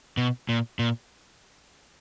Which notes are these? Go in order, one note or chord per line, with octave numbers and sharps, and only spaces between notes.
B2
A#2
A#2